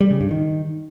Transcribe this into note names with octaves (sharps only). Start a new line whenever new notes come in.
G3
C#3
G2
D#3